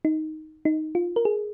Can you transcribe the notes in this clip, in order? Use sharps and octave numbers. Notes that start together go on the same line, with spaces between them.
D#4
D#4
F4
A#4
G#4